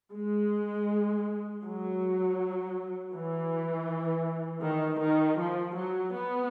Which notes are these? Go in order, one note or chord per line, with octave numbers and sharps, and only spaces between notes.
G#3
F#3
E3
D#3
D#3
F3
F#3
B3